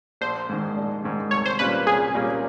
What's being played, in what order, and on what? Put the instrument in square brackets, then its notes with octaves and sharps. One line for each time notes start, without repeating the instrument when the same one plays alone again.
[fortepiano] A#1 [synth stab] C5
[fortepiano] G#2 D#3
A#1
G#2 D#3
[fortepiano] C2 [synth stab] C#5
[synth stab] C5
[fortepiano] A#2 G3 A#3 C#4 [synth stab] B4
[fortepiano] C2 [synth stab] G#4
[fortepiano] A#2 G3 A#3 C#4